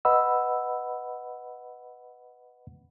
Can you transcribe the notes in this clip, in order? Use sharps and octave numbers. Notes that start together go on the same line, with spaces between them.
B4 D#5 F#5 B5 E6